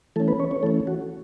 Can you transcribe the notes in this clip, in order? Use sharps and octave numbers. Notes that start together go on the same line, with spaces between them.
E3 A3 C#4 A4
B3 B4
C#4 C#5
C#4 C#5
E3 A3 C#4 A4
F#4